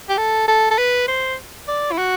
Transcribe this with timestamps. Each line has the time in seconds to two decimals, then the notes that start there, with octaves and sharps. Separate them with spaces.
0.09 G4
0.17 A4
0.48 A4
0.71 A4
0.78 B4
1.08 C5
1.68 D5
1.92 E4
1.98 F#4